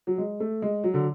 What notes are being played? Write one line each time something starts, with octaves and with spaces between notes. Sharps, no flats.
F#3
G#3
A3
G#3
F#3
D3